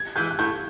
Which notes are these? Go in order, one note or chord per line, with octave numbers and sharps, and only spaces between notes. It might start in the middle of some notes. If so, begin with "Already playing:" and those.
Already playing: G#6
E3 G#3 G6
F#6
A2 G6